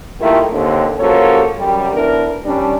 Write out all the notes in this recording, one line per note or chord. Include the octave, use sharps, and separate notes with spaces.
D#3 A3 A#3 E4 F4 G4
D#2 D3 C4
C#3 F3 A#3 F#4 A4 C#5
F#2 G3
D2 B3 D4 E4 A#4
D#3 G3 C#4 D4